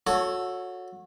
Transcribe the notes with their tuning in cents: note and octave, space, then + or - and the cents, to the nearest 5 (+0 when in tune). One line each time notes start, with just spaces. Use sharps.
F#4 -25 A4 +0 C#5 +0